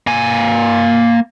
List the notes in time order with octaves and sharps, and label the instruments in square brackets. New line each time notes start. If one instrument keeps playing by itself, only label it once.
[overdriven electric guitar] A#3 G#5